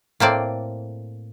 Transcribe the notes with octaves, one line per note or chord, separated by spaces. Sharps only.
A2 A#3 C4 D5